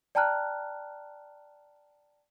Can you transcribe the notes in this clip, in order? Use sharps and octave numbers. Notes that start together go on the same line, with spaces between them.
D5 G5 A5 A#5 F6 F#6